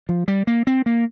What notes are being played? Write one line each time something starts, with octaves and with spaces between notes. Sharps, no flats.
F3
G3
A#3
C4
A#3